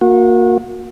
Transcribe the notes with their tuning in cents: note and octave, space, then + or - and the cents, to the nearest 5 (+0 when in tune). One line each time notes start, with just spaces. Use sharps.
A#3 +0 F#4 -30